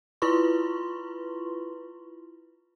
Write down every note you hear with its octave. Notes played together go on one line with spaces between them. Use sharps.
E4 F4 B4 C6 C#6